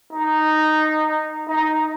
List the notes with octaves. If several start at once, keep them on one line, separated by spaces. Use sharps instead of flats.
D#4
D#4